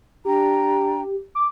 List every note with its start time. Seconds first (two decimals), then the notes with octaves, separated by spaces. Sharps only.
0.25 D4 G4 G5 A#5
1.35 D6